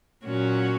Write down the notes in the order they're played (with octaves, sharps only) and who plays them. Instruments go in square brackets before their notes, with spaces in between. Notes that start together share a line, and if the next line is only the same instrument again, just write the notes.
[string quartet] A#2 F#3 C#4 F#4